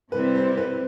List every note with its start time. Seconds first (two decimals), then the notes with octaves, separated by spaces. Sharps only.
0.11 C3 G3 C4 E4 B4
0.35 C5
0.57 B4